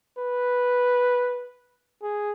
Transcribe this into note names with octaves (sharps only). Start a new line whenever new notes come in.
B4
G#4